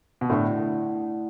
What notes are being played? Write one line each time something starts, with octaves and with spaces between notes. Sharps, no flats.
B2
A2 D3 A3 E4 D5 F#5